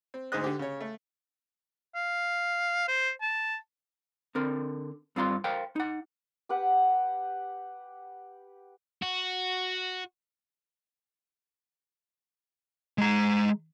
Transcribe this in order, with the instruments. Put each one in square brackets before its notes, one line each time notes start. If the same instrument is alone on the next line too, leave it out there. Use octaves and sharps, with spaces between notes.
[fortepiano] C4
D2 G#2 G#4 C5 D#5 F#6
D3 G4
C#3 C#5
A3
[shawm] F5
C5
A5
[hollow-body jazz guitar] D3 C4 A#4
G2 C4 F4 A#5 C6
A#4 C5 F5 G5
D#4 F#5
[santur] G4 B4 F#5
[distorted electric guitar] F#4
[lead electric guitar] G#3 A#5